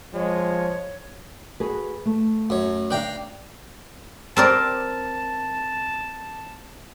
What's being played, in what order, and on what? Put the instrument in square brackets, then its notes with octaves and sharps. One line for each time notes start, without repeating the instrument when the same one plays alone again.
[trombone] F3 [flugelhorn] G#3 [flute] C#5
[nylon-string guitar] F#4 G#4 B4
A3
[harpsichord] F#2 C#5
[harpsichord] D4 G5 A#5 [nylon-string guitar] B4 F5
[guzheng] C4 A#4 D5 [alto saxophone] A5